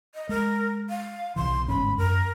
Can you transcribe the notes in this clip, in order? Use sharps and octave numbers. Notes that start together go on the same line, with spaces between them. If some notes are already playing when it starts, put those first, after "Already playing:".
D#5
G#3 A#4
F5
B1 C3 E3 C6
G1 G#2 C#4 B5
F#2 A#4